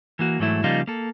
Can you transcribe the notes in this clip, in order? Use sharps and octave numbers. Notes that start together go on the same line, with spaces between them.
E3 A#3 F#4
G#2 E3 F#3 A3 E4
C#3 F3 G3 A#3 D#4 F4
A#3 A4